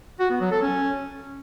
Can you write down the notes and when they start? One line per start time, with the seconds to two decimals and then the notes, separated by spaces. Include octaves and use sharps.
0.20 F#4
0.30 B3
0.41 F#3
0.51 A4
0.62 C#4